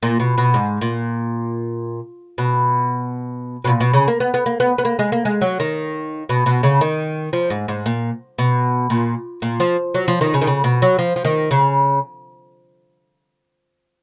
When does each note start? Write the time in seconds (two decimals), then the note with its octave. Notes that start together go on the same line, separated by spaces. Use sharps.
0.03 A#2
0.20 B2
0.38 B2
0.54 G#2
0.81 A#2
2.38 B2
3.64 B2
3.67 A#2
3.80 B2
3.93 C#3
4.08 A#3
4.20 B3
4.34 B3
4.46 A#3
4.60 B3
4.78 B3
4.85 A#3
4.99 G#3
5.12 A#3
5.25 G#3
5.41 F#3
5.60 D#3
6.29 B2
6.46 B2
6.63 C#3
6.81 D#3
7.33 F3
7.50 G#2
7.68 G#2
7.86 A#2
8.38 B2
8.90 A#2
9.42 A#2
9.60 F3
9.94 F#3
10.08 F3
10.21 D#3
10.34 C#3
10.41 D#3
10.47 C#3
10.64 B2
10.82 F#3
10.99 F3
11.16 F3
11.25 D#3
11.51 C#3